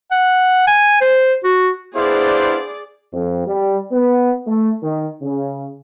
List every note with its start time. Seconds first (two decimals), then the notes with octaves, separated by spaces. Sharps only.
0.11 F#5
0.67 G#5
1.01 C5
1.44 F#4
1.95 B3 D4 E4 G#4 C5 D5 F5
3.13 F2
3.46 G3
3.92 B3
4.47 A3
4.83 D#3
5.22 C#3